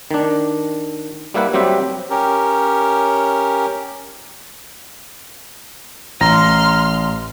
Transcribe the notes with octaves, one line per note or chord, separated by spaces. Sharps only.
D#3 D4
G3 A#3 E4 B4 F#5
F#3 G3 C4 G4 E5
C#4 G4 A#4
A1 A#5 C6 F6 A#6